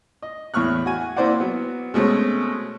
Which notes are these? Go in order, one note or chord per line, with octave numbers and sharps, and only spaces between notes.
D#5
E2 A2 C#6 F6 F#6
F#4 G#5
A#3 C4 E4 C5 D5 F#5
F#3 B3
B2 G#3 A3 C4 C#4